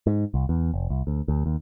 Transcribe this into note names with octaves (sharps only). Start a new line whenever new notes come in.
G#2
C2
E2
F1
C2
D2
D2
D#2